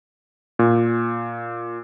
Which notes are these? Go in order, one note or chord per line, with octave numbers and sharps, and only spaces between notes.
A#2